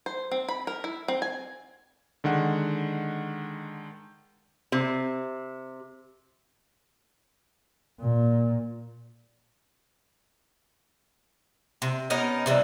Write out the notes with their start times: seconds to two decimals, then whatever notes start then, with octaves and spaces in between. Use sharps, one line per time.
0.06 C5
0.31 C4
0.48 B5
0.67 A#4
0.84 E4
1.08 C4
1.22 G#5
2.24 D3 D#3 G#3 F#5
4.72 C3
8.00 A#2
11.82 C3
12.10 B3 C#4 D#4 A#4
12.46 C3 E3 G3